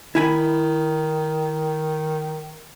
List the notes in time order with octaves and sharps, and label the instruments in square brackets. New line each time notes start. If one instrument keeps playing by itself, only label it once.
[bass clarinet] D#3 [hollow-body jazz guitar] E4 G#5 B5